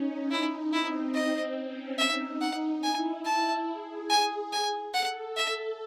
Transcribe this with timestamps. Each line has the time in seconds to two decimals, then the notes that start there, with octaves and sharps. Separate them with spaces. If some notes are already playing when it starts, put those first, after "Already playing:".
Already playing: C#4 D#4
0.31 D#4 E4
0.73 C4 E4
1.14 D#5
1.57 C#4
1.98 D#4 E5
2.41 F#5
2.83 E4 G#5
3.25 A5
3.67 G#4
4.10 G#5
4.52 G#5
4.93 A4 F#5
5.37 E5